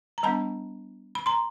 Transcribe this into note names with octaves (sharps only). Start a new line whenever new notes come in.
A#5
G3 B3 D4 A5 B5
B5
A#5 C6